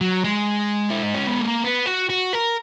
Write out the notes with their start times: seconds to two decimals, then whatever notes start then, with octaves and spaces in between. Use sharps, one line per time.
0.01 F#3
0.24 G#3
0.90 E4
1.03 D#4
1.14 C#4
1.27 B3
1.40 A#3
1.64 B3
1.86 F#4
2.10 F#4
2.33 A#4